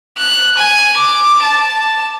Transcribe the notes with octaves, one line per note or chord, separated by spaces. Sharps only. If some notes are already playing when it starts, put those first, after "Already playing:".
F#6
G#5
D6
A5